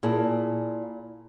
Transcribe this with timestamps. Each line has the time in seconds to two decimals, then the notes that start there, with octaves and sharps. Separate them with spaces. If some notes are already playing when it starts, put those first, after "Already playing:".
0.03 A#2 E4 G#4 A5